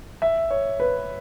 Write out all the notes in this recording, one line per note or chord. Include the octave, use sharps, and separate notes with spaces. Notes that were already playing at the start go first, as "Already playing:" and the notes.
E5
C#5
B4